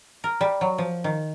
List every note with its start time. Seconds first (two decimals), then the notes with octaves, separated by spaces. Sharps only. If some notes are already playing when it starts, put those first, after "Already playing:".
0.24 A#4
0.41 G3
0.61 F#3
0.78 F3
1.04 D#3